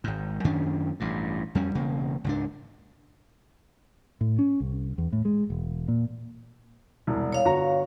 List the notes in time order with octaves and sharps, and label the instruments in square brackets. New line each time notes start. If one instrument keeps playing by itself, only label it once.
[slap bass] G#1 G#2
F#2 D#3 C#4 D4
A1 G2
F2 G3 C#4
E1 C#3 A#3
C#2 G#2 D4
[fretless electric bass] A2
C#4
C2
E2
A2
G#3
E1
A#2
[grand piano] E1 C2
[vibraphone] C#5 F5
[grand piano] G1 F#4 A#5